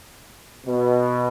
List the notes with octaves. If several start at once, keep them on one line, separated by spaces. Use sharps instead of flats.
B2